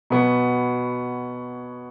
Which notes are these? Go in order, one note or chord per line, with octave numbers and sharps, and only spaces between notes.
B2 F#3 B3